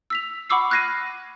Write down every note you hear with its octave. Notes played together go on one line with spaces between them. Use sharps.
E6 B6 F7
F#5 B5 C#6 D6 E6 C7
F6 F#6 G#6 A#6 C7 D#7